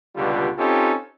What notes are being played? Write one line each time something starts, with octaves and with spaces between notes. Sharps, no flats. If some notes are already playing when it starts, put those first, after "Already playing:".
C#2 B2 D3 G3 F4 G4
C4 C#4 D#4 F4 G4 A4